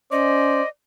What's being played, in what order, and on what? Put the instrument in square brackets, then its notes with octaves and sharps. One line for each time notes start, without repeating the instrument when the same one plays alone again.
[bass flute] C#4 [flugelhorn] C5 [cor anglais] D5 [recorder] D#5